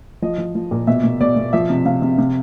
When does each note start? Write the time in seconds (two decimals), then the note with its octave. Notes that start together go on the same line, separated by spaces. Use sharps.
0.22 F3 D#5
0.38 F3
0.55 F3
0.71 A#2
0.87 B2 E5
1.04 B2
1.20 B2 D5
1.36 B2
1.53 F3 E5
1.70 C3
1.85 C3 F5
2.02 C3
2.18 C3